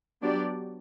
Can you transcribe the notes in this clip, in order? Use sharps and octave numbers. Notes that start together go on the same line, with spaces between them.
F#3 B3 D4 G4 D5